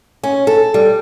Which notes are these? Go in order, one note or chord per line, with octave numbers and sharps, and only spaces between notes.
C#4
A4
G3